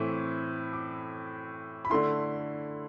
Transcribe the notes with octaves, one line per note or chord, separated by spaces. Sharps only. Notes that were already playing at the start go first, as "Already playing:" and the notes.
Already playing: A2 E3 A3 C4 E4
D6
B5
D3 A3 E4 C6